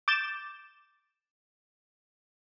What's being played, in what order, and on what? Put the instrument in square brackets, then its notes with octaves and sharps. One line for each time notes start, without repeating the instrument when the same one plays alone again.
[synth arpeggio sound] D6 G6 A6 E7